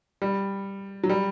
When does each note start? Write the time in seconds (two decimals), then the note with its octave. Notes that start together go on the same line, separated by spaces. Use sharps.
0.22 G3
1.03 F#3
1.09 G3